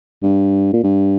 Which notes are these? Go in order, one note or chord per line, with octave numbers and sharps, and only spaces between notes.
G2
A#2
G2